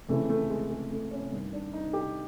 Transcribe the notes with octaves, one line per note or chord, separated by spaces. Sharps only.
F2 C#3 E3 A3
A3
G#3
G#3
A3
C#4
G2 D#3
D4
D#4
G4